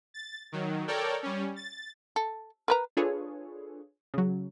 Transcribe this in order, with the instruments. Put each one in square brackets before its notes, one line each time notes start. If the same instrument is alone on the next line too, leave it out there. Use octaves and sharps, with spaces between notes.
[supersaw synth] A6
D#3 F#3
A4 A#4 C#5 D5 G5
G3 C#4
A6
[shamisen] A4
A#4 B4 A#5
[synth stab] D4 F4 G#4 A4 B4 C#5
C#3 F#3